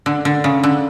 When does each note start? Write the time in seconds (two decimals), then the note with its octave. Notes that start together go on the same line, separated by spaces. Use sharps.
0.06 D3
0.25 D3
0.44 C#3
0.63 D3